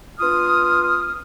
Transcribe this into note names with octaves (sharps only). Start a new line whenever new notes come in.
B3 D4 F4 D#6 F6